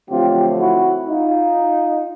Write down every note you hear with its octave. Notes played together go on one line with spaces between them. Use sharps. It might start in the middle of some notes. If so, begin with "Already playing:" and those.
F2 D3 F#3 A3 C4 F4 G4
E4 F#4
D#4 F4